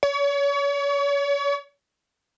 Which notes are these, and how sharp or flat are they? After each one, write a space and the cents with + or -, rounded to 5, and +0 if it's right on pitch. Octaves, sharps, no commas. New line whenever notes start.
C#5 +35